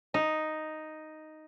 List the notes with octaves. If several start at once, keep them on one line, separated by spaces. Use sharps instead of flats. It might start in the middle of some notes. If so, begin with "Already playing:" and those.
D#4